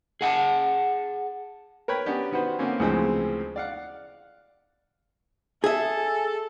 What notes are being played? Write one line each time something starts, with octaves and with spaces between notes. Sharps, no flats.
G#4 F#5 G5 A5
A#4 B4 C#5 G5 B5
B3 C#4 D4 G4
D#3 B3 F#4 B4 C5
D3 A#3 C4 C#4
D2 C#3 E3 F3 G#3 C4
D5 F5 F#5
G#4 A4 E5